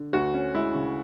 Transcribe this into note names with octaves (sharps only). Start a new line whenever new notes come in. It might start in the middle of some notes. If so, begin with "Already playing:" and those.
Already playing: D3
D2 F#4
C#4
G#3 E4
C#3